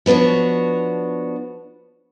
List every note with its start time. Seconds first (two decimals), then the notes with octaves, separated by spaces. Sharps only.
0.06 F3 B3 D4 F#4 C#5